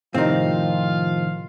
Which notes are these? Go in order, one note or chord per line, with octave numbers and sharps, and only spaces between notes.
A2 C3 D#3 F3 C4 D#4 F4 F5